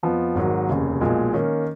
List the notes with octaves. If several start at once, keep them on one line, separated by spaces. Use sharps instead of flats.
F2 F3 B3
G#1 G#2 D#3 F#3
F1 D#2 C#3
B1 A#2 F3 G#3
D#3 A#3 C#4